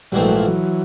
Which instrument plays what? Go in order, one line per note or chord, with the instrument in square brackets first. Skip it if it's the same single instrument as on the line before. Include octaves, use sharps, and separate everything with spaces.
[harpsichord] A#1 G#2 E3 A3 C4 [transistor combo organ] G3
[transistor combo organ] F#3
F3
E3 F#3